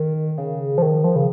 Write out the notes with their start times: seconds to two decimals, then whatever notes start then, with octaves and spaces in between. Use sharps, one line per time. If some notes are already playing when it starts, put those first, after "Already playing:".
Already playing: D#3
0.38 C#3
0.78 F3
0.82 D#3
1.04 F3
1.16 C#3